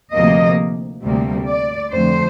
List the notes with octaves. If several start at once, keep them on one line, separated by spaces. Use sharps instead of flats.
D2 C3 F3 A#3 D#5
D2 C3 G3 A#3
D5
F2 D3 A3 C5